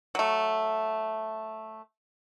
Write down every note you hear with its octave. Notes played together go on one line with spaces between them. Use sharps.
F#3 A3